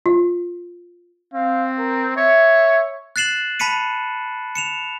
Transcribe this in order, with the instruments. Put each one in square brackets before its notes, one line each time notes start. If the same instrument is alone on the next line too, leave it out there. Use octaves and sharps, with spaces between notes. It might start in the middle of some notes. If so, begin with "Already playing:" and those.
[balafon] F4
[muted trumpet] C4 [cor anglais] F5
[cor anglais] A#4
[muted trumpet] C#5 [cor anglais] E5
[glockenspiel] F#6 A6 C7 E7 F#7
A5 B5 B6 C#7 D#7
C#7 E7 F7